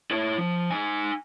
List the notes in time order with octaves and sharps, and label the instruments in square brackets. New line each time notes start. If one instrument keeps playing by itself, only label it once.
[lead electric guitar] E4 C#5
F3
D#4 G#5